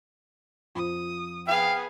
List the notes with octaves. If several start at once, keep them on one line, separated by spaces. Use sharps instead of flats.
F2 F3 D#6
B3 G#4 F5 G5